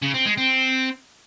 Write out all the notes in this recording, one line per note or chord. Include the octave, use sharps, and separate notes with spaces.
C#3
C4
G#3
C4